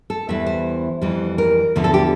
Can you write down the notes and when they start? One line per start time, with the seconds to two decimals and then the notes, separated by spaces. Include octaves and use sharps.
0.10 A4
0.29 E2 E3 G3 E5
0.46 C5
1.02 F2 E3 G3
1.38 A#4
1.76 E2 D3 F3
1.84 A4
1.94 G4